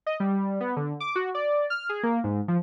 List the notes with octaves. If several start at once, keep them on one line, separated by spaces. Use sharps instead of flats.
D#5
G3
B3
D3
D6
F#4
D5
F6
G#4
A#3
G#2
F3